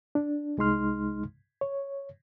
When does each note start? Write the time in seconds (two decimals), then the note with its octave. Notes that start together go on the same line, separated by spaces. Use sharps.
0.15 D4
0.58 C2 G#3 D#4 C6 F6
1.61 C#5